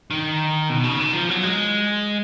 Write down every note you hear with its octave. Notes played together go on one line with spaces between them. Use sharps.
D#3
B2
C#3
D#3
F3
F#3
G#3